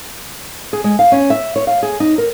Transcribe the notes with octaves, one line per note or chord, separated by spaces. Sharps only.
G#4
G#3
F5
C#4
E5
C#5
F5
G#4
D#4
A#4